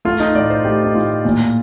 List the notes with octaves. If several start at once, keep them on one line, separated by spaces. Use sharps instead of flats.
A3 F4
D#4
A2 D5
C5
A3 G4
D#4
A2 F4
A#2